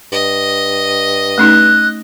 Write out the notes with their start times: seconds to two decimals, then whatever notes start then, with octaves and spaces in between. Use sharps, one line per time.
0.12 G2 D#5
1.38 A3 C#4 D#4 F#6